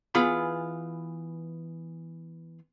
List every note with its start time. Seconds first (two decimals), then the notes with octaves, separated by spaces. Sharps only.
0.15 E3 B3 F4 G#4 B5